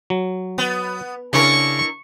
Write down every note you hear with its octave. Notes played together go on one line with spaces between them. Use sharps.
F#3
B3
C#3 C#4 D4 E4 A#4 C#6